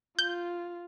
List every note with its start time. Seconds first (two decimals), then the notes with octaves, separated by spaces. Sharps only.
0.19 F4 G6